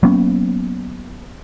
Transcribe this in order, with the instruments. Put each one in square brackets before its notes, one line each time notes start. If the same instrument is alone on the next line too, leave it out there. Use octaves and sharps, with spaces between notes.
[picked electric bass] F#3 A#3 B3 C#4